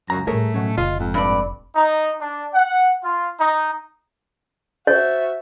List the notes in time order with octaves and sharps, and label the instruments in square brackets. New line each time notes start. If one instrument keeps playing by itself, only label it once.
[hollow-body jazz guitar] C#2 A#5 [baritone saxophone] F#2
[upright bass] A2 G3 [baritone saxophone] A3 [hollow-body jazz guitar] G#4 A#4 C#5
[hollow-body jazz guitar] B2 F#3 C#4
[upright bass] F1 [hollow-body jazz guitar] C#3 D#5 [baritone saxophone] F4
[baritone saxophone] F2 [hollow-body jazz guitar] G#2
[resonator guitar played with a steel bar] G2 D5
[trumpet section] D#4
D4
F#5
F4
D#4
[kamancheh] F#4 E5 [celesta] C5 A6 [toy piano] C#5